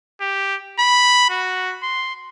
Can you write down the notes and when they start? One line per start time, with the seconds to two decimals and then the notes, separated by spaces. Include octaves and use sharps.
0.21 G4
0.79 B5
1.30 F#4
1.83 C6